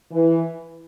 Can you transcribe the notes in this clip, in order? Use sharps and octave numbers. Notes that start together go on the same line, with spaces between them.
E3